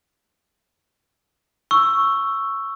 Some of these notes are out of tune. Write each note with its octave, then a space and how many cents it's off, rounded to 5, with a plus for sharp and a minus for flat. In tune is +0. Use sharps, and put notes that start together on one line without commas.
C#6 +0 E6 +10